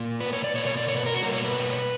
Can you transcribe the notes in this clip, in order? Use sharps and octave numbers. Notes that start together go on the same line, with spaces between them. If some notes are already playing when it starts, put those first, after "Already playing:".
Already playing: A#2 A#3
B4
C#5
D5
B2 A#3 C#5
C#5
D5
C#5
B4
A#4
F#4
B2 G3 A#3 A#4
C#5
B4